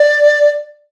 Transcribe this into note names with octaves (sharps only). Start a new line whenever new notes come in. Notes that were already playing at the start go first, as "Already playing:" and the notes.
Already playing: D5